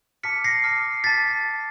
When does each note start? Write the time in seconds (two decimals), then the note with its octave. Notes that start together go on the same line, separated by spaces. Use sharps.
0.23 A5 D6 F6 B6 C#7
0.44 A#6 C7
0.63 A5 D6 F6
1.04 A5 D6 F6 A6 B6